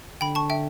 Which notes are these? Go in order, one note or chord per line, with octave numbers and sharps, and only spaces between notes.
D3 G5 B5
A5 C#6
E5 G5